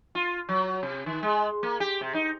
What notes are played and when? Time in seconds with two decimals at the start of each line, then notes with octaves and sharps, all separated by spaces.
0.15 F4
0.49 F#3
0.83 C3
1.06 D#3
1.23 G#3
1.63 A#3
1.80 G4
2.01 C3
2.14 D#4